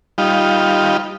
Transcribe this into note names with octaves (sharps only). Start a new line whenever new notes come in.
G3 D#4 F4